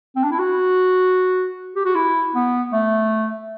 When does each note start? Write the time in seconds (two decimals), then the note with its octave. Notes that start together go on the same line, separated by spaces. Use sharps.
0.16 C4
0.24 D4
0.32 E4
0.39 F#4
1.76 G4
1.85 F#4
1.95 E4
2.35 B3
2.73 A3